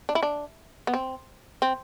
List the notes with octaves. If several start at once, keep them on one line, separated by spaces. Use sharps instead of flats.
D4
E4
D4
B3
C4
C4